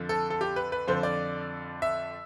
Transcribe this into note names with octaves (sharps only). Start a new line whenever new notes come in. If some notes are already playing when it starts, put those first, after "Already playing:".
Already playing: F2 D3 F3
A4
A4
G4
B4
B4
F2 D3 F3 C5
D5
E5